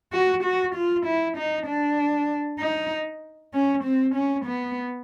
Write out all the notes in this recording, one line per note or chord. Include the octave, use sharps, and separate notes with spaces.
F#4
F#4
F4
E4
D#4
D4
D#4
C#4
C4
C#4
B3